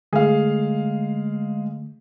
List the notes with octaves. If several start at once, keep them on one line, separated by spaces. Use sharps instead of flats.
D3 G#3 A3 G#4 F5